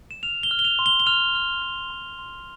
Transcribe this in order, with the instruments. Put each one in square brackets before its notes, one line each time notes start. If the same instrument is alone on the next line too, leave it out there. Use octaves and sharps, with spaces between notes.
[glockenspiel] E7
F6 F7
G7
F6
G7
F7
C6
G7
G7
F6 F7
F6
F6
C6
C6